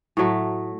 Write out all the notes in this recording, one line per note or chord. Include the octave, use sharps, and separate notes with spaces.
A2 F#3 A3